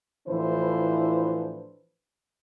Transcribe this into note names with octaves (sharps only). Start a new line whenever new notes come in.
A2 E3 F3 D4 B4 C5